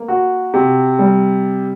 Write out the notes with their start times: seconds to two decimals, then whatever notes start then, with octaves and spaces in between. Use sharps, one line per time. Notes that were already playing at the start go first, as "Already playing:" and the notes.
Already playing: A#3
0.08 F#4
0.54 C3
0.99 G3